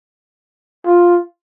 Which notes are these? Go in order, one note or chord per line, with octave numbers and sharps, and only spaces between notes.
F4